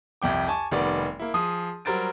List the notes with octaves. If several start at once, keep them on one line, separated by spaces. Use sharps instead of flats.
C2 F2 G5 D6
G#5 A5 C#6
F1 D#3 G3 B3 D5
A#3 E4
F3 G#4 D#6
F#3 G3 A#4 C5 A6 D7